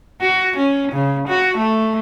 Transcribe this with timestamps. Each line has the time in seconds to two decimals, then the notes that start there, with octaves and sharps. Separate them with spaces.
0.21 F#4
0.57 C#4
0.92 C#3
1.28 F#4
1.57 A3